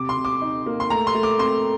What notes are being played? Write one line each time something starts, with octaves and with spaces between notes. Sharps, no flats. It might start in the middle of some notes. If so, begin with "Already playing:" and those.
Already playing: C3 D6
C6
C3
D6
D#4
A#3
C6
A3 A#5
C6
A3
D6
C4 C6